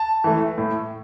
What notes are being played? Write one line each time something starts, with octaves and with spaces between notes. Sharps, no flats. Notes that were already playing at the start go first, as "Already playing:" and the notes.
Already playing: A5
E3 A3
A2